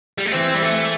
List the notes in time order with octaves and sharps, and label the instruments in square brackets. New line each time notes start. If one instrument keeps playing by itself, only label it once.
[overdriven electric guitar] G3
A3
[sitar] E3 [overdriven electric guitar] C4
[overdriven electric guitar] G3
A3